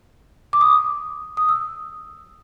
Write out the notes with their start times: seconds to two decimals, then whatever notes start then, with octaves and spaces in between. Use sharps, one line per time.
0.53 D6
0.61 D#6
1.37 D#6
1.49 E6